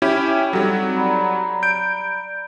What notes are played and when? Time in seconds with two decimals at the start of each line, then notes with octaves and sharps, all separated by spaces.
0.02 C#4 E4 G4
0.25 G5
0.53 F#3 G3 C4 D#4 A4
0.96 D5 A#5 B5
1.63 G6 D7